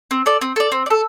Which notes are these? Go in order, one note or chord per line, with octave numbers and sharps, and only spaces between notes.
C4
A4 D5
C4
A4 D5
C4
D5
A4